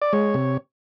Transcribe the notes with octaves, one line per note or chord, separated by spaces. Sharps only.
D5
G#3 C#5
C3